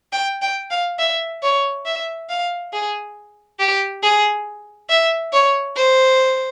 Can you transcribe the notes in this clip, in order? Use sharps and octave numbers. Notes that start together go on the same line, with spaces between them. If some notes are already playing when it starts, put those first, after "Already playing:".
G5
G5
F5
E5
C#5
E5
F5
G#4
G4
G#4
E5
C#5
C5